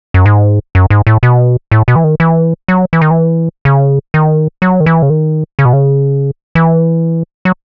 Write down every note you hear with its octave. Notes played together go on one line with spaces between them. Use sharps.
F#2
G#2
F#2
G#2
A2
B2
A2
B2
E3
D#3
E3
F#3
E3
D#3
E3
C#3
D#3
F#3
D#3
E3
C#3
D#3
C#3
B2
C#3
E3
F#3